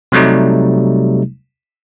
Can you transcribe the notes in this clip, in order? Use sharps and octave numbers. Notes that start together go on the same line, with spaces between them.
C3 F#3 G3 A3 D#4